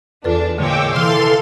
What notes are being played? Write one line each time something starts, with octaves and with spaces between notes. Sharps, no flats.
E2 D4 F4 A4 B4
A#2 D3 G#3 C#5 G5 D6 E6
C3 E3 A4 F5 C6 F6